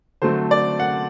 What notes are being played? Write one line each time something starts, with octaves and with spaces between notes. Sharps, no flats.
D3 F#3 A3 C4 C5
D5
F#5